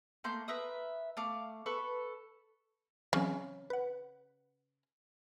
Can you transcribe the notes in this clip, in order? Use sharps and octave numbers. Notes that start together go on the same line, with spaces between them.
A3 A#3 C6 G6
A#4 B4 E5 D#6
A3 F5 D6
A4 B4 C#6
C#3 E3 F#3 C4
B4 F#5